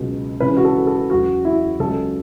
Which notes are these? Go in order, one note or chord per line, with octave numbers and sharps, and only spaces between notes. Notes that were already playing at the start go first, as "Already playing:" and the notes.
Already playing: C#2 B2 F#3
C#2 C#3 E3 B4
F#4
A4
A4
E2 C#3 F#3 F#4
E4
C#2 C#3 F#3 A4